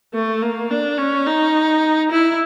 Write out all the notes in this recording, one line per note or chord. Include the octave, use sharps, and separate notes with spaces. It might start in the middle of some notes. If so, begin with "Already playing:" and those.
A3
A#3
D4
C#4
D#4
E4